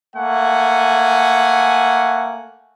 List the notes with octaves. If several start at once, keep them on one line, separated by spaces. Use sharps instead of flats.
A3 A#3 F#5 G#5